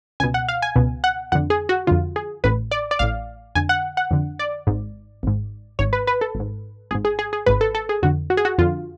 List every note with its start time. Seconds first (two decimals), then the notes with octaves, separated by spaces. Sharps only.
0.20 C#2 G#5
0.24 B2
0.34 F#5
0.48 F5
0.62 G#5
0.76 C#2 B2
1.04 F#5
1.32 F2 D3 F#5
1.50 G#4
1.69 F#4
1.87 F2 D3 F4
2.16 G#4
2.44 A1 A2 B4
2.71 D5
2.91 D5
2.99 A1 A2 F5
3.55 F2 D3 G#5
3.69 F#5
3.97 F#5
4.11 F2 D3
4.39 D5
4.67 G#1 G#2
5.23 G#1 G#2
5.79 G#1 G#2 C#5
5.93 B4
6.07 B4
6.21 A4
6.35 G#1 G#2
6.91 G#1 G#2 G#4
7.05 G#4
7.19 G#4
7.33 G#4
7.46 G#1 G#2 B4
7.61 A4
7.75 A4
7.89 G#4
8.03 F2 D3 F#4
8.30 F#4
8.37 G#4
8.45 F#4
8.58 F2 D3 F4